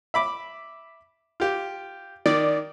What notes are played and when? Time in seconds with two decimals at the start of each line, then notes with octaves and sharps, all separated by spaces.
0.14 E5 B5 D6
1.40 F4 G4
2.26 D#3 D5